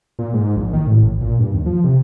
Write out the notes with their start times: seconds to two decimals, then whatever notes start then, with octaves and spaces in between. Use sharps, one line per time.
0.19 A#2
0.34 G#2
0.56 A#1
0.73 D#3
0.87 A2
1.03 A1
1.21 A#2
1.39 G2
1.53 D#2
1.66 F3
1.84 C3